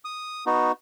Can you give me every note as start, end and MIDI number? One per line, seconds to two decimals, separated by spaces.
0.05 0.45 87
0.46 0.72 59
0.46 0.72 63
0.46 0.72 66